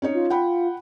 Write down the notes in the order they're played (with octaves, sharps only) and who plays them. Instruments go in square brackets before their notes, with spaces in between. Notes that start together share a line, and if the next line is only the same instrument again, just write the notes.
[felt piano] C#4 D#4 C#5
[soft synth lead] F4
[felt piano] F#5 G5 B5